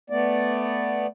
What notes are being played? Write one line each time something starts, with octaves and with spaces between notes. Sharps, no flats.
A3 B3 D5